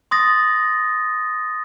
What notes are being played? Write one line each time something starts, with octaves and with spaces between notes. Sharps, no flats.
C6 D#6 A6 A#6